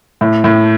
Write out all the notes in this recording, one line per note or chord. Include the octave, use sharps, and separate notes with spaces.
A2
A2